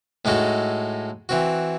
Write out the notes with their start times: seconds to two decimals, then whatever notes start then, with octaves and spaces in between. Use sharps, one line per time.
0.25 A2 G#3 D#4 F#4 A4
1.29 E3 C4 F#4